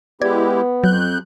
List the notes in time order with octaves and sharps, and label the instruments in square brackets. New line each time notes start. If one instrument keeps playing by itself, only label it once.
[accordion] G#3 E4 G4 [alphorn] B3 [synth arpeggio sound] D5 G#6
[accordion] F2 F#6 G6 [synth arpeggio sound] F#3